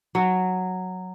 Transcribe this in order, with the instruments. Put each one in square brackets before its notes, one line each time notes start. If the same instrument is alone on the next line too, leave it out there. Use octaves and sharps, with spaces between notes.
[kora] F#3